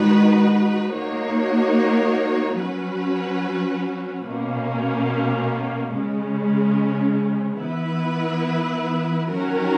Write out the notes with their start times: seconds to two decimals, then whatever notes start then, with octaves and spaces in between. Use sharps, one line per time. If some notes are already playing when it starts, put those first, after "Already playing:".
Already playing: D#3 G#3 D#4 F#4 B4
0.91 A#3 D#4 F#4 C#5
2.58 F#3 C#4 F#4 B4
4.25 B2 A#3 C#4
5.93 C#3 G#3 C#4
7.60 E3 B3 E4 B4
9.28 D#3 F#3 C#4 F#4 A#4